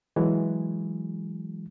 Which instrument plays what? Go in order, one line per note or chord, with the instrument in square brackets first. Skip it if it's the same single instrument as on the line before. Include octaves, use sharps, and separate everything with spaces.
[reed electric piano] E3 F#3 G#3